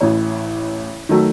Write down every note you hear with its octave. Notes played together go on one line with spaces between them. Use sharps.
A1 A2 E3 C#5
D#3 F#3 A3